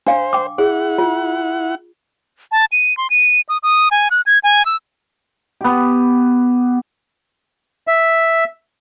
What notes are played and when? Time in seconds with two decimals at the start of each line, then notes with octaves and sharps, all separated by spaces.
0.07 D4 C5 F5
0.33 G5 D6
0.58 E4 G#4 F#5
0.98 F4
2.52 A5
2.72 D#7
2.97 C6
3.10 D#7
3.49 D#6
3.63 D#6
3.91 G#5
4.11 F#6
4.26 G#6
4.44 G#5
4.66 E6
5.61 B3 G4
7.87 E5